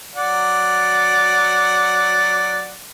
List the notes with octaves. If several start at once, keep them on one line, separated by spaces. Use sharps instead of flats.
F#3 D5 F#5